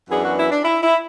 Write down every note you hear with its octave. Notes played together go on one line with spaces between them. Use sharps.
F#2 E3 B3 D4 G#4
F#4
E4
D4
E4
E4